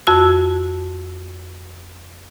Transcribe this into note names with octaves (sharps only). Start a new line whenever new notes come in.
F2 F#4 E6